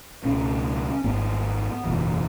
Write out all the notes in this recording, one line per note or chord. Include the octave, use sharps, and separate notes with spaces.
C#2 B2 C#4
G#1 G#2 B3
F#1 E2 B2